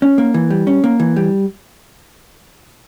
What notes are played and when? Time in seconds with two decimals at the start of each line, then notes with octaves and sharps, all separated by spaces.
0.02 C#4
0.18 A#3
0.34 E3
0.50 G3
0.67 C#4
0.84 A#3
1.00 E3
1.16 G3